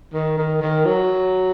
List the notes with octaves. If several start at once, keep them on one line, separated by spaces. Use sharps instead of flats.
D#3
D#3
D#3
F#3